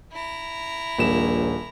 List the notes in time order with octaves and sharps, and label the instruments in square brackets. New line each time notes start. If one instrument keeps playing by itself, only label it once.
[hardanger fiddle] E4 A#5
[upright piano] D#1 E7 [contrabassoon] A#1